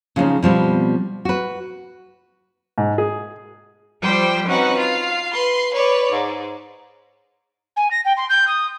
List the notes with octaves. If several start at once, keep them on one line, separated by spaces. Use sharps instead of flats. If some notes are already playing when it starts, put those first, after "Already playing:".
C#3 F3 G#3 B3 C#4 D#4
B2 F3 G3 C4
F#4 B4
G#2
G#4
F3 G3 C5 G5
C4 C#4 D#4 F#4 B4 F#5
F4 F5
B4 C6
B4 C#5 D5
G#2
G#5
A#6
G5
C6
G6
D#6